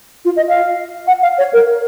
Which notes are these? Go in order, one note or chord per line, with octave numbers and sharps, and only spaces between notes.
F4
D#5
F5
F#5
F5
C#5
A#4